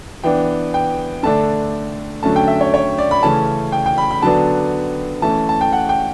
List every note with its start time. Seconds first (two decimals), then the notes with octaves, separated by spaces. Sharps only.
0.23 E3 B3 D4 G5
0.74 G5
1.23 D3 A3 D4 A5
2.23 D3 F#3 A3 C#4 A5
2.36 G5
2.48 E5
2.61 C#5
2.74 C#5
2.98 D5
3.11 B5
3.23 C#3 E3 A3 C#4 A5
3.72 G5
3.86 G5
3.98 B5
4.11 B5
4.22 D3 F#3 B3 D4 A5
5.22 E3 A3 C#4 A5
5.49 A5
5.61 G5
5.73 F#5
5.89 G5